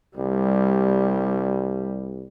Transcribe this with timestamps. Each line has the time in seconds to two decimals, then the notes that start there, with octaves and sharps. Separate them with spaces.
0.17 C2 G3